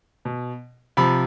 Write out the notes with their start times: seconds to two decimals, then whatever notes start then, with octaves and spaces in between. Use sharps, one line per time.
0.25 B2
0.97 C3 F3 B5